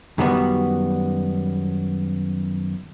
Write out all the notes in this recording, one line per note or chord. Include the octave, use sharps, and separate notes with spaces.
F#2 D#3 G3 B3 F#4